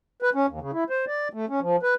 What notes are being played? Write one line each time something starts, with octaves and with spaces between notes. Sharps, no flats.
B4
C#4
D#2
C#3
E4
C5
D5
A3
C#4
F3
B4